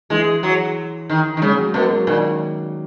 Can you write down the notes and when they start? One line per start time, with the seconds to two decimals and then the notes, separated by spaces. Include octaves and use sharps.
0.10 E3 G#3
0.43 F#3
1.10 D#3
1.37 D#3
1.42 C#3 G#3
1.58 F#3
1.74 B2 A#3
1.91 F#3
2.07 A#2 D#3